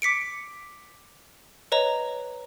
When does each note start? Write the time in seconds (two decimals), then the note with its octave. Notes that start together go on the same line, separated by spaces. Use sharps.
0.02 D6 B6 C#7 D7
1.72 B4 C#5 D#5 A#5